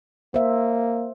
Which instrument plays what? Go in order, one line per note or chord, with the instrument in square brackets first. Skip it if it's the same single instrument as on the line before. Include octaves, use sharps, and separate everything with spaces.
[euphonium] A#3 [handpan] C5 E5